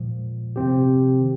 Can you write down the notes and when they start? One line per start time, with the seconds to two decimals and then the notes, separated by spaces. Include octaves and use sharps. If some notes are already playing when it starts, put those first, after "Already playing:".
Already playing: A#2 F3 G#3
0.56 C3 F3 C4 G4
1.21 D#3